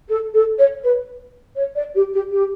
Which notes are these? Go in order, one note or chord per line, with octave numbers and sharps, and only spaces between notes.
A4
A4
C#5
B4
C#5
D5
G4
G4
G4